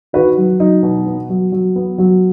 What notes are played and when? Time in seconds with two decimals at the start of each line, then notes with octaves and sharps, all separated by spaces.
0.13 D#3 F#4 B4
0.37 F#3
0.60 F#3 D#4
0.83 B2
1.06 B3
1.29 F#3
1.52 F#3
1.76 B3
1.98 F#3